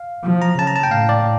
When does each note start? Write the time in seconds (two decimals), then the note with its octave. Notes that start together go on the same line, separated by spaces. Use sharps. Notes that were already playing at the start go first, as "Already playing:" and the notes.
Already playing: F5
0.24 F3
0.42 A#5
0.58 C#3 A5
0.67 A#5
0.76 A5
0.83 G5
0.91 A2 F5
1.09 D5